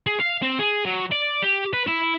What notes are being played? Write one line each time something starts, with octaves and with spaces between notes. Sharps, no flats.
G#4
F5
C4
G#4
F#3
D5
G4
B4
E4